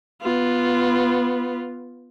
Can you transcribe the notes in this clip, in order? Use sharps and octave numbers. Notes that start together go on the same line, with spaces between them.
B3 F4